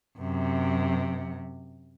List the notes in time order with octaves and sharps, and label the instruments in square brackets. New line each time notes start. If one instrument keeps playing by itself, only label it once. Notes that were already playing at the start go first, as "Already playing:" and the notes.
[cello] F#2 C3